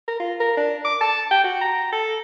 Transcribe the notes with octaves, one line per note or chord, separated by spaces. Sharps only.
A#4
F4
A#4
D4
D6
A5
G5
F#4
A#5
A4